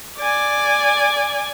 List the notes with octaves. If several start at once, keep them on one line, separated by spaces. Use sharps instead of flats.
D5 G#5